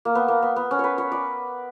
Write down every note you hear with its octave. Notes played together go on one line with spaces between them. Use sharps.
A#3
B3
A#3
B3
B3
C#4
B4 C#5
C#5
D5